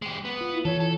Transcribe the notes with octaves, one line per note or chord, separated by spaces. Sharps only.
G#3 G4
B3
F4
E4
E3 A4 C#5
A4